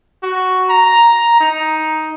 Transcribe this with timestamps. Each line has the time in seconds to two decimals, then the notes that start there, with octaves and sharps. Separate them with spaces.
0.23 F#4
0.70 A#5
1.41 D#4